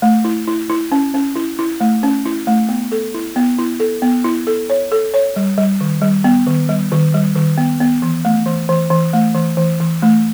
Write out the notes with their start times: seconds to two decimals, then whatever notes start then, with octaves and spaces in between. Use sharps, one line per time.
0.02 A3
0.24 E4
0.48 E4
0.70 E4
0.92 C#4
1.14 C#4
1.35 E4
1.59 E4
1.80 A3
2.03 C#4
2.26 E4
2.47 A3
2.69 B3
2.92 A4
3.14 E4
3.36 B3
3.59 E4
3.80 A4
4.02 B3
4.24 E4
4.47 A4
4.70 C#5
4.92 A4
5.14 C#5
5.36 G3
5.58 G3
5.80 D#3
6.02 G3
6.24 B3
6.46 D#3
6.69 G3
6.92 D#3
7.14 G3
7.36 D#3
7.58 B3
7.80 B3
8.02 E3
8.25 A3
8.46 E3
8.69 E3
8.90 E3
9.13 A3
9.35 E3
9.57 E3
9.80 E3
10.02 A3